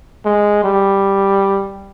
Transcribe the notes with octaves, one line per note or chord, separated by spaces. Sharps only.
G#3
G3